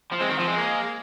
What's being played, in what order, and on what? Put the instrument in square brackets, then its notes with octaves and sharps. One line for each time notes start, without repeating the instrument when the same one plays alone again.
[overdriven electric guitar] F3
[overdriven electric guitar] G#3 [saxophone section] C4
[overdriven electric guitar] D#3
F3
G#3
[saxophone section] A#3